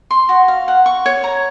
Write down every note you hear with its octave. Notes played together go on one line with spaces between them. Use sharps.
C6
F#4
F5
F#5
C#6
C#5
A#5